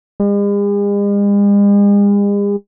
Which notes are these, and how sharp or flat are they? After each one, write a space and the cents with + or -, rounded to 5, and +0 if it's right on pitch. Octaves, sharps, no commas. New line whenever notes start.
G#3 -45